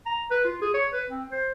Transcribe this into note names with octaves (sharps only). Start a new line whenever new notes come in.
A#5
B4
F4
G#4
C#5
B4
C4
C5